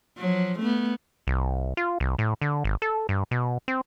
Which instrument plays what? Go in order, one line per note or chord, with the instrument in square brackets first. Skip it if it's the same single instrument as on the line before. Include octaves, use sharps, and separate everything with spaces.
[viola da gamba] F3 F#3
A3 B3
[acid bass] C2
F4
C2
A2
D3
G#1
A4
G2
B2
C4